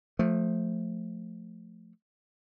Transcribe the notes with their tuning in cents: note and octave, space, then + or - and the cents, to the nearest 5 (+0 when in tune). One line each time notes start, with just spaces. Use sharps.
F3 +15 A3 +0